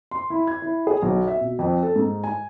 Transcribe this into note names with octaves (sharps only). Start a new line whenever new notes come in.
C6
E4
G#6
E4
G#4
B1
E5
B2
F2
A4
G#2
G#5